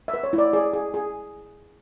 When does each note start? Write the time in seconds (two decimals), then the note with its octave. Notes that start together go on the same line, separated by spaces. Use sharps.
0.08 E5
0.14 B4
0.24 C#5
0.33 E4
0.38 D5
0.53 G#4 D5
0.74 G#4
0.94 G#4